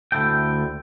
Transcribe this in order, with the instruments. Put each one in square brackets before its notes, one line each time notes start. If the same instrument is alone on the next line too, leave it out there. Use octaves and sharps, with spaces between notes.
[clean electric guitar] D2 E4 A4 G5